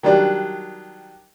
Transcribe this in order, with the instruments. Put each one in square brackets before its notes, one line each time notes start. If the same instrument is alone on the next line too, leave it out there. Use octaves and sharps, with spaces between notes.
[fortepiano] D#3 F#3 G3 D4